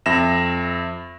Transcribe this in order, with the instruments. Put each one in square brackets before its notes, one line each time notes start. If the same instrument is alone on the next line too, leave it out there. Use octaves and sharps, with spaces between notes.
[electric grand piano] F2 E5 A#6 E7